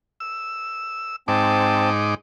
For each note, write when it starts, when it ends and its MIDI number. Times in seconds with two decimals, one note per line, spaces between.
0.20 1.16 88
1.28 2.15 44
1.28 1.89 60
1.28 2.15 63
1.28 1.89 81
1.28 2.15 86